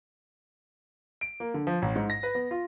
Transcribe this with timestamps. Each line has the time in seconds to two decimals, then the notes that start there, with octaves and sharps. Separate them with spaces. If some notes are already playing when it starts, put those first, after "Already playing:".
1.21 D7
1.40 A#3
1.54 D3
1.67 F3
1.82 A1
1.96 G#2
2.10 A#6
2.23 B4
2.35 B3
2.51 F4